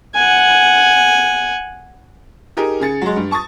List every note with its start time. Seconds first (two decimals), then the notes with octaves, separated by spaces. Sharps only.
0.15 F#5 G#5
2.57 D#4 G4 G#4 A#4
2.80 C#3 G#4 A6 C#7
3.01 F#3 G#3
3.16 G2
3.31 A5 C#6 D#6 A6